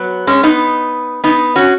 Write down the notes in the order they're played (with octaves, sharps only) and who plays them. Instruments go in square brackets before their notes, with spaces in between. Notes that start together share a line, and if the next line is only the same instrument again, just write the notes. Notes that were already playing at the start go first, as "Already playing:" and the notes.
Already playing: [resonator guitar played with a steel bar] F#3 B3
G#3 C#4
B3 D#4
B3 D#4
C#4 F#4